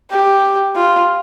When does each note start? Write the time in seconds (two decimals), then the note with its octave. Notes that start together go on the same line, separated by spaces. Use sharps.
0.11 G4
0.76 F4